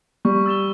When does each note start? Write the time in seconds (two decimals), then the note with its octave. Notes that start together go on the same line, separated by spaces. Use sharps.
0.25 G3 C#6
0.46 E6 A6 E7 G7